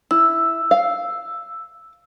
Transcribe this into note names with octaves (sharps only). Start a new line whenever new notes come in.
E4 E6
F5